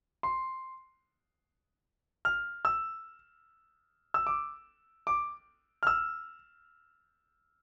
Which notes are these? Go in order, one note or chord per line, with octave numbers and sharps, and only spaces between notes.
C6
F6
E6
E6
D6
D6
F6
E6